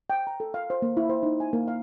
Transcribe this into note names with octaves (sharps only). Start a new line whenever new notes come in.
G5
A#5
A4
F5
C5
A#3
E4
C5
D#4
G#5
A#3
F5